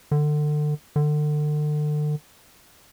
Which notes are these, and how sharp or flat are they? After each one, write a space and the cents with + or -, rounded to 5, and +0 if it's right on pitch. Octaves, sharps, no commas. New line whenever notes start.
D3 +30
D3 +35